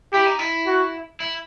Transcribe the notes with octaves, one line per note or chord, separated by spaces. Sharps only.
E4 G4
D#4
E4
F#4
E4